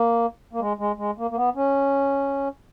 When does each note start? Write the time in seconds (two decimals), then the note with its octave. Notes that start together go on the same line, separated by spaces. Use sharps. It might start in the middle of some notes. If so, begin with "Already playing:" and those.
Already playing: A#3
0.53 A#3
0.60 G#3
0.79 G#3
0.98 G#3
1.18 A#3
1.31 A#3
1.36 B3
1.55 C#4